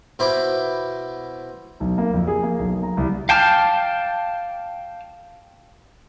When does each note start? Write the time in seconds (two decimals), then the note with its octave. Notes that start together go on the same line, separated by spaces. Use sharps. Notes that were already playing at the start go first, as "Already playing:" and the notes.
0.19 B2 E4 C5 D6
1.80 B1
1.98 A#3
2.14 F2
2.27 G#4
2.43 A#3
2.59 B1
2.83 A#5
2.97 C2
3.29 F5 G5 A5 D6 F6